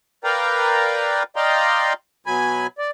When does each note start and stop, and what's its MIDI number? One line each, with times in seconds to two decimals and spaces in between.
0.24 1.23 70
0.24 1.23 71
0.24 1.23 74
0.24 1.23 77
0.24 1.23 79
0.24 1.23 82
1.36 1.93 74
1.36 1.93 75
1.36 1.93 77
1.36 1.93 79
1.36 1.93 82
1.36 1.93 84
2.26 2.67 47
2.26 2.67 54
2.26 2.67 80
2.26 2.67 83
2.78 2.91 74